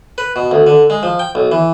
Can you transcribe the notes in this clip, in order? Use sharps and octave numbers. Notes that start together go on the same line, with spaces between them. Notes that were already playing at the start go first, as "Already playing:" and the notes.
B4
B2
D2
D3
G#3
F3
G5
B1
E3